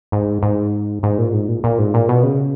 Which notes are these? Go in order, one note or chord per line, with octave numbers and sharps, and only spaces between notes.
G#2
G#2
G#2
A#2
G#2
A#2
A#2
G#2
A#2
B2
C#3